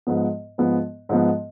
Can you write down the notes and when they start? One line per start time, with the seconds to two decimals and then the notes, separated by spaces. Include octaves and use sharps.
0.07 G#2 F3 B3
0.58 G#2 F3 B3
1.09 G#2 F3 B3